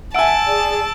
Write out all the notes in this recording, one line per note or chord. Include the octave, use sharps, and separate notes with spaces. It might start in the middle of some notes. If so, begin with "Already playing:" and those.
E5 F#5 G#5 A5 E6 D7
G#4 D5